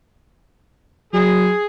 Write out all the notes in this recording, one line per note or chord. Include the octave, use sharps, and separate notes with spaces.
F#3 G#4